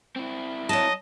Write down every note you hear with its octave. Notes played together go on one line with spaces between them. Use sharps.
C4 E4
F#3 D#5 A5